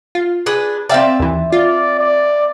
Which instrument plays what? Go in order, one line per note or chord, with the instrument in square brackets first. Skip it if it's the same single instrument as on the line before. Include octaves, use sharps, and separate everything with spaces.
[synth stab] F4
[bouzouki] D4 G#4 B4
[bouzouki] C4 E5 A5 [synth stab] D5 F5 G5
[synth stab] D#2 E3
[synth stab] F4 [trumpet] D5
[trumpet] D5